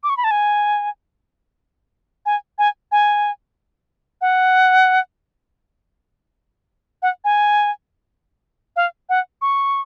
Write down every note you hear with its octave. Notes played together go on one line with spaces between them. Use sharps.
D6
C#6
B5
A5
G#5
G#5
G#5
G#5
F#5
F#5
G#5
F5
F#5
C#6